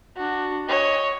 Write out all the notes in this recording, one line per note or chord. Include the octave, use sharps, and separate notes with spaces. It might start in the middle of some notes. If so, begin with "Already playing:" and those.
D4 F#4
C#5 D#5